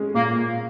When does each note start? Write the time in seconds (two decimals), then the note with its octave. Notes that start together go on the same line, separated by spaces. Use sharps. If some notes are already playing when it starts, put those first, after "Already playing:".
Already playing: G#3 C#4
0.15 A#2 A#3